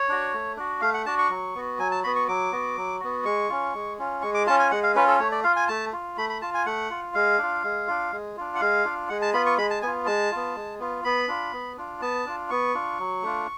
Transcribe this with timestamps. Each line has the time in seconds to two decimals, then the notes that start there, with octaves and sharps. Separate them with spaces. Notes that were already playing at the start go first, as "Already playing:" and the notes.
Already playing: C#5
0.09 D4 F#4
0.34 A3
0.57 D4 F#4
0.81 A3 F5
0.94 F#5
1.06 D4 F#4 A5
1.18 C#6
1.30 F#3
1.55 B3 F#4
1.79 F#3 G#5
1.91 A5
2.04 B3 F#4 B5
2.16 C#6
2.28 F#3 D6
2.52 B3 F#4
2.77 F#3
3.00 B3 F#4
3.25 G#3 C#6
3.49 C#4 F4
3.74 G#3
3.99 C#4 F4
4.22 G#3 C#6
4.34 D6
4.47 C#4 F4 A5
4.59 G#5
4.71 G#3 F#5
4.83 F5
4.96 C#4 F4 B4
5.08 A4
5.20 A3 C#5
5.32 D5
5.44 F4 F5
5.56 G#5
5.68 A3 A5
5.93 F4
6.17 A3 B5
6.29 B5
6.42 F4 A5
6.54 G#5
6.66 A3 F#5
6.90 F4
7.14 G#3 F5
7.39 D4 F4
7.64 G#3
7.87 D4 F4
8.12 G#3
8.37 D4 F4
8.55 F#5
8.60 G#3 F5
8.85 D4 F4
9.09 G#3 F#5
9.22 A5
9.33 B3 F4 B5
9.46 C#6
9.57 G#3 B5
9.70 A5
9.82 B3 F4 G#5
10.06 G#3 A5
10.31 B3 F4
10.55 G#3
10.79 B3 F4
11.04 B3 B5
11.28 D4 F4
11.53 B3
11.77 D4 F4
12.01 B3 A5
12.26 D4 F4
12.50 B3 C#6
12.75 D4 F4
12.99 F#3
13.23 A3 D4 F4